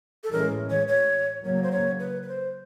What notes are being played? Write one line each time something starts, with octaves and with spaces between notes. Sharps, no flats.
A4
A2 E3 G#3 C#4 A#4
C#5
C#5
C#3 F#3 A#3 C#5
C5
C#5
B4
B4
C5